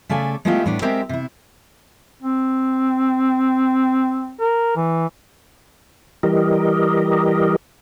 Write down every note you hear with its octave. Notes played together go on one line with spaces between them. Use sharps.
C#3 A3 A4 D5 G#5
G#3 A3 B3 E4 F4 G4
A2 G3 B3 D4
G#3 C4 G4 A#4 C5 E5
C3 E4
C4
A#4
E3
E3 G3 G4 A#4 D#5